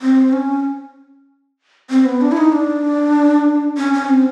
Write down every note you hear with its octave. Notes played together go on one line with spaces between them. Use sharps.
C4
C#4
C4
B3
D4
E4
D#4
D4
C#4
C#4
C4